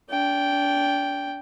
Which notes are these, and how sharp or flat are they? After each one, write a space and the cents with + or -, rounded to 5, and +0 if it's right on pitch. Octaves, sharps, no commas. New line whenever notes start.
D4 -35 G5 +0